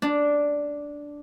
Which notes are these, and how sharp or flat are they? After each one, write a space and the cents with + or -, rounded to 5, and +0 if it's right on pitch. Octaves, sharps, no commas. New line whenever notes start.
D4 -5